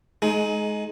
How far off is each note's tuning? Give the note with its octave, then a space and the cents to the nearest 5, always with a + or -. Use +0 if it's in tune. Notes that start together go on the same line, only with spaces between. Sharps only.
G#3 +20 D#4 +5 G#4 +40